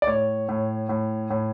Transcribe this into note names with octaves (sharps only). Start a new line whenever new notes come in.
D5
A2 C#5
A2
A2
A2